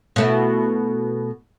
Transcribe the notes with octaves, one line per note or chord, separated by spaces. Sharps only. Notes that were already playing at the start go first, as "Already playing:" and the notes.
B2 A3 E4